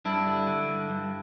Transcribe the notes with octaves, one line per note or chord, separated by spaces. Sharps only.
G2 D4 E4
D3
D3
G2
G2